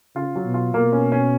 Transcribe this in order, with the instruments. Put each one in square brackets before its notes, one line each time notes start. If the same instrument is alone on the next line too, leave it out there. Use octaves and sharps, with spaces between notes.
[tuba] C#3 [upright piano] F4
[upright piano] F#3
[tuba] B2
[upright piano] F4
[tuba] B2 [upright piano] A#3
[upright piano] C#4
C#4